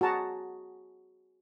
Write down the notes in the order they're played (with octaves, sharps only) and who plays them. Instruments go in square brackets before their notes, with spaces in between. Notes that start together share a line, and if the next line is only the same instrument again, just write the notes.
[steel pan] F#4 G#4 A5 A#5